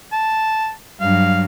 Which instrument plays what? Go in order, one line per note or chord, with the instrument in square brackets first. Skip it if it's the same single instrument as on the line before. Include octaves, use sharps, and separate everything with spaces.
[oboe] A5
[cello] G2 F#3 [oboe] F5